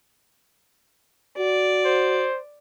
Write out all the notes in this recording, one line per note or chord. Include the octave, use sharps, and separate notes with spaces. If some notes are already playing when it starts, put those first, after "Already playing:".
F#4 D5
C5